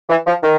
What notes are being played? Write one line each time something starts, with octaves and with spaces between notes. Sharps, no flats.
E3
F3
D#3